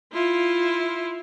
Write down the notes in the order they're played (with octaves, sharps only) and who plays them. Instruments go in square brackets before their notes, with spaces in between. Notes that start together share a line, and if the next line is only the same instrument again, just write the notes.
[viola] E4 F4